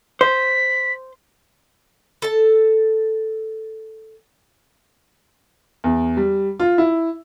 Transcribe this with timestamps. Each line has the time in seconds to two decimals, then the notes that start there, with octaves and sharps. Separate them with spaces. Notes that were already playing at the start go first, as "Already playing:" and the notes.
0.21 C5 B6
2.22 A4 A5
5.84 E2
6.17 G3
6.60 F4
6.78 E4